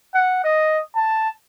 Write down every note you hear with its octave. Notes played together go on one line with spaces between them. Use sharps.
F#5
D#5
A5